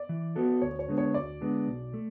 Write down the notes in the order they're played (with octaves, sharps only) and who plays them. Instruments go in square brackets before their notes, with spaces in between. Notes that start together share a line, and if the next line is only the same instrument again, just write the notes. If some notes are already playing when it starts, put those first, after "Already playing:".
Already playing: [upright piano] D5
[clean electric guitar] E3
B3 F#4 A4
[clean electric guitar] D2 [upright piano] C#5
[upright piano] C#5
[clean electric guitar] D3 G#3 B3
[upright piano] C#5
[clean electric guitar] D2 [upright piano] D5
[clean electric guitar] D3 G#3 B3
B1
A3